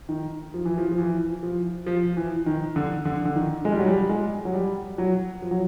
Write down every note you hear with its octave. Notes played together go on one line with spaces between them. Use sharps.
D#3
F3
E3
F3
F3
E3
F3
F3
E3
D#3
D3
D3
D3
D#3
G#3
G3
F#3
G3
G#3
F#3
G3
F#3
F3
F#3